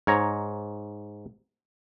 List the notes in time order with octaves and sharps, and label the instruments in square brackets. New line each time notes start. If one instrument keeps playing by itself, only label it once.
[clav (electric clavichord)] G#2 C#5 A#5